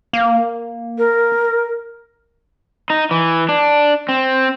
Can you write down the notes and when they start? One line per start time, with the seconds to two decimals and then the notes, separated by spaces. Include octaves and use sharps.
0.13 A#3
0.98 A#4
2.90 D#4
3.11 E3
3.49 D4
4.09 C4